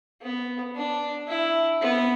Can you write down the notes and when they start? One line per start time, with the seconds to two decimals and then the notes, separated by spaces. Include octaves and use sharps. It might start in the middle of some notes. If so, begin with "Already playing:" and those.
0.22 B3
0.76 D4
1.28 E4
1.82 B3